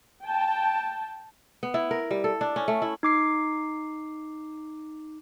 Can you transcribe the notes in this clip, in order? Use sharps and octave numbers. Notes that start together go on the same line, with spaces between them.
G5 A5
B3
E4
A#4
G3
A4
D4
C#4
A3
E4
D#4 D6 C7